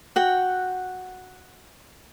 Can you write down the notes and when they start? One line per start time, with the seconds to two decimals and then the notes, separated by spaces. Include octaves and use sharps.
0.16 F#4 F#5 G5